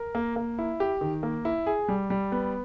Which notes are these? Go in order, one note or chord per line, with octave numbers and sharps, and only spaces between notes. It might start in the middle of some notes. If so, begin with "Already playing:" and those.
Already playing: A#4
A#3
A#3
E4
G4
D#3
A#3
E4
G#4
G3
G3
B3